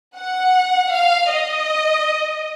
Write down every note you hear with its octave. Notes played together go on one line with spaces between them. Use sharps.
F#5
F5
D#5